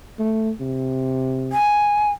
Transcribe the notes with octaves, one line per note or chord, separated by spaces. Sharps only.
A3
C3
G#5